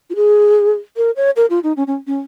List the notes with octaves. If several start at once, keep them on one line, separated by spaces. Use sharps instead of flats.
F4
G#4
A#4
C#5
A#4
F4
D#4
C#4
C#4
C#4